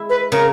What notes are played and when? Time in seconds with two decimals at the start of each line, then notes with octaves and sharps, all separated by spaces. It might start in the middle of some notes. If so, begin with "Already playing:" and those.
Already playing: G#3 E4
0.10 B4
0.32 C#3 A#4